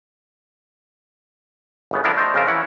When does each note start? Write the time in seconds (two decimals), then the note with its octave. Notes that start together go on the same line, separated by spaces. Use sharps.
1.91 G1 C#3 B3
2.04 F3 B3 D4 E4 G4 A#4
2.17 A3 C5 D5 D#5
2.34 F2 C#3 F4 A#4 E5
2.47 E3 C#4 E4 F#5